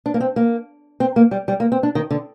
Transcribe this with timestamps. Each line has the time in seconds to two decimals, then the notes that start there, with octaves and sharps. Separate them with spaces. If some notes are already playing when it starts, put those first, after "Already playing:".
0.06 D4
0.14 A#3
0.21 C4
0.36 A#3
1.00 C4
1.16 A#3
1.31 G3
1.48 G3
1.60 A#3
1.72 C4
1.83 D4
1.95 D#3
2.11 D3